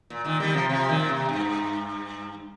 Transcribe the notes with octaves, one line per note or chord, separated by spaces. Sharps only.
A#2
A#2 D#3
D#3 G3
C3 F3
C3 F3
A#2 D#3
A#2
C3
G2